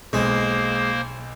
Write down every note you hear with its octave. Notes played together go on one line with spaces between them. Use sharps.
B1 G#3 A#3 C5